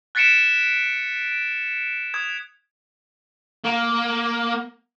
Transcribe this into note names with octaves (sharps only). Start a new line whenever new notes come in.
F#6 A6 B6 C#7 D7 E7
D7
D#6 G#6
A#3